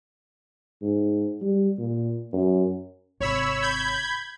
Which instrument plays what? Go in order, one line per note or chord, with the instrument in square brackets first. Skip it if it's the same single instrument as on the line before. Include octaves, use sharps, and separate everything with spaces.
[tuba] G#2
G3
A#2
F#2
[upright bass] G#1 C3 [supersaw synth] C#5 B5 E6
[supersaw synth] B5 G6 G#6